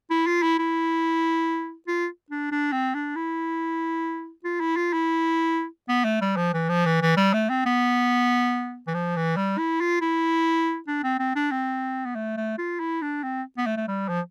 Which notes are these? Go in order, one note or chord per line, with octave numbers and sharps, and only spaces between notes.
E4
F4
E4
E4
F4
D4
D4
C4
D4
E4
F4
E4
F4
E4
B3
A3
G3
F3
E3
F3
E3
E3
G3
A3
C4
B3
E3
F3
E3
G3
E4
F4
E4
D4
C4
C4
D4
C4
B3
A3
A3
F4
E4
D4
C4
B3
A3
A3
G3
F3